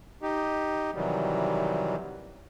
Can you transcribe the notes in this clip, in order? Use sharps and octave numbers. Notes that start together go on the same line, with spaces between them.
D#4 G4
C3 D#3 E3 F#3 G3